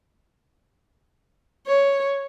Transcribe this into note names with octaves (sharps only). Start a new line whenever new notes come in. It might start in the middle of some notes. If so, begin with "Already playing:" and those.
C#5